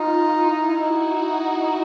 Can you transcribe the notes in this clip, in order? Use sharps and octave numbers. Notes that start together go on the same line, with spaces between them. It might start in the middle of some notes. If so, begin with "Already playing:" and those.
Already playing: D#4 F4
E4
D#4 F#4